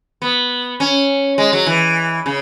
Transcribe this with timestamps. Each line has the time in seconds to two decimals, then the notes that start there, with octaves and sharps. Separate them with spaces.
0.22 B3
0.80 C#4
1.38 G#3
1.53 F#3
1.67 E3
2.26 C#3